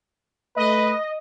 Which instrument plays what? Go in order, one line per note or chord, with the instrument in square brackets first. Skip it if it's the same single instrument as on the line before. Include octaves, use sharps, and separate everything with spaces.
[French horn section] A3 [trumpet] B4 [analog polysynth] D#5